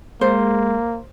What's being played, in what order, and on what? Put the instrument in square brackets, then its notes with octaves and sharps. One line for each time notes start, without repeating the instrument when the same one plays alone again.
[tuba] G#3 [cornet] A#3 [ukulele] C5